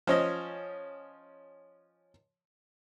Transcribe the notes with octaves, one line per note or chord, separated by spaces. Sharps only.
F3 C#4 D#5